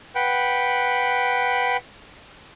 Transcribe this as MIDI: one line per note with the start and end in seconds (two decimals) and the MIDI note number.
0.15 1.77 71
0.15 1.77 78
0.15 1.77 79